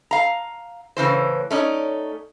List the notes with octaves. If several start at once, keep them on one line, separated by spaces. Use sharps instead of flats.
F5 A#5
A2 C#3 E3 C5
A3 C#4 D#4 D5